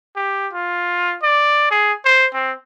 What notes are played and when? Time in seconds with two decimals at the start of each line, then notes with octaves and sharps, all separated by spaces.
0.16 G4
0.54 F4
1.23 D5
1.71 G#4
2.05 C5
2.34 C4